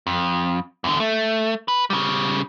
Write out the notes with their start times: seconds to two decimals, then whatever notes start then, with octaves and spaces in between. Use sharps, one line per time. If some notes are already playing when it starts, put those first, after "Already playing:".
0.07 F2
0.84 E2 D3
1.00 A3
1.68 B4
1.90 C#3 G3